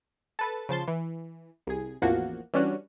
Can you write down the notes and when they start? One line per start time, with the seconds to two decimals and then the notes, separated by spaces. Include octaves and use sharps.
0.39 A4 B4 A5
0.69 C#3 F3 A5 C6
0.88 E3
1.67 C2 G#4
2.02 A1 E2 F3 A#3 F#4
2.54 E3 G3 C#4 D4 F#4